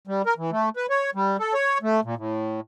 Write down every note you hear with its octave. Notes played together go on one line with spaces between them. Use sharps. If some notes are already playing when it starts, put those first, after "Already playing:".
G3
A#4
E3
A3
B4
C#5
G3
A4
C#5
A3
A#2
A2